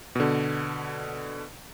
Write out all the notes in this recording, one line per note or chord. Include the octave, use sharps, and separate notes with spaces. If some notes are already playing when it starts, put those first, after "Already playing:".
B2 D3